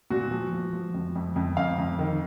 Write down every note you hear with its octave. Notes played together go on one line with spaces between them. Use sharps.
A#2 F#4
F3
F3
F3
F2
F2
F2
F2 F5
F2
D#3